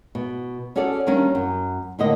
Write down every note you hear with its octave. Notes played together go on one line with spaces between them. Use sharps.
B2
C#4 F#4 G#4 A4 D5
D#3 G3 A#3 C#4 D4
F#2
A2 D3 A#3 D#5